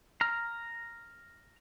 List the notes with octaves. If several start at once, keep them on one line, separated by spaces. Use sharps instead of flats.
A#5 F6